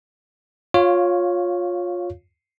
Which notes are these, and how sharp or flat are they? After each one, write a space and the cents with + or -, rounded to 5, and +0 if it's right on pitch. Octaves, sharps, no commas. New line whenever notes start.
F4 +20 C#5 +0 F5 +0